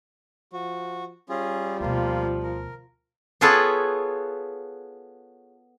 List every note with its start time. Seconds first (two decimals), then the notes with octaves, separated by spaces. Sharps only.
0.53 F3 F#4
1.29 G3 C#4 F4 G#4
1.81 D2 B2 F3 A#3 F4
2.43 A#4
3.41 B3 F4 G#4 A4 B4 C#5